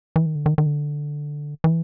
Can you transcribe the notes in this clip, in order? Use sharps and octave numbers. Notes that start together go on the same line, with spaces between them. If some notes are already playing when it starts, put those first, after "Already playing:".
E3
D#3
D3
D#3
D#3
D3
E3